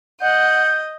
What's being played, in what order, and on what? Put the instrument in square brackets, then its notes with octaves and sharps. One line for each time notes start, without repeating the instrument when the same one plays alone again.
[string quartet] D#5 [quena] F#5 [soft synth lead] G6